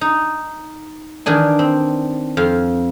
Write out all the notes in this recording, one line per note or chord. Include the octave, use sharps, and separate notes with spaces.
D#4
D#3 E3 D4 G#5
C4
F2 F5 C6